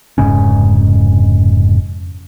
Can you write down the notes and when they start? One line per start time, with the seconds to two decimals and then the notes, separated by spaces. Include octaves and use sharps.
0.18 F1 G#2 C#3 C#4